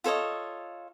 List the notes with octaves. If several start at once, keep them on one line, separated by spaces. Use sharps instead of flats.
F4 A4 C#5 D#5